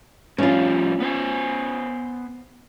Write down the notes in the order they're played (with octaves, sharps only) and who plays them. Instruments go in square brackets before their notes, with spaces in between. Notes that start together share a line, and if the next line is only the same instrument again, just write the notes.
[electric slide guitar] A2 F3 G3 [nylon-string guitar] C#4 F4
[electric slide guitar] B3 C5 G#5